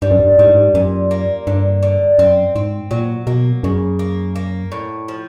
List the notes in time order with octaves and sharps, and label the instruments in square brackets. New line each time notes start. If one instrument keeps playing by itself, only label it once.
[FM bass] G2 [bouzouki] G3
[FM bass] F#2
G2
[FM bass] G#2 [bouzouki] G3
[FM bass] G2
G#2
[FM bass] F#2 [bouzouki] A#2
[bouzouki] A#3
[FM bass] G2 [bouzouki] D3
[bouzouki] D3
[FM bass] F#2 [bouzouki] C4
[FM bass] G#2 [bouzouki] C4
[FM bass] A#2 [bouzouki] F#3
[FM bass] B2 [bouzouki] A#3
[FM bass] F#2 [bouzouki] C#3
[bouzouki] A#3
A#3
A2
F3